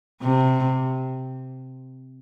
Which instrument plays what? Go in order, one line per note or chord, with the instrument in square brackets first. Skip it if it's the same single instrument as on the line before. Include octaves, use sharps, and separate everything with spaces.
[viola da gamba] C3